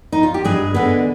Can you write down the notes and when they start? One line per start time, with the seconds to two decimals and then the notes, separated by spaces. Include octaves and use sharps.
0.12 D#4
0.23 F4
0.34 G4
0.45 G2 G#3 G#4
0.74 D3 G#3 B3